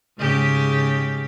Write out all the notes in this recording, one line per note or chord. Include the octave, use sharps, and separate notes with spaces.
G#2 C#3 G4